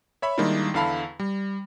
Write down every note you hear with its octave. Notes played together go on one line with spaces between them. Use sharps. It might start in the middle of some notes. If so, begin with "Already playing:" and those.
C#5 E5 B5
D#3 G3 G#3 A#3 D4 E4
E2 D3 E4 F5 A5 B5
G3